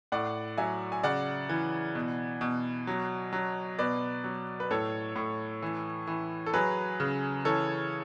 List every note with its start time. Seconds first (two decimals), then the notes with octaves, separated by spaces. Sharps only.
0.12 A2 D5 F#5
0.58 F#3 E5 G#5
0.92 G#5
1.03 C#3 D5 F#5
1.49 E3
1.95 B2
2.41 B2
2.87 F#3
3.33 F#3
3.79 B2 B4 D5
4.24 F#3
4.60 B4
4.71 A2 A4 C#5
5.16 A2
5.63 E3
6.07 E3
6.46 A4
6.54 F#3 G#4 B4
7.00 C#3
7.45 E3 A4 C#5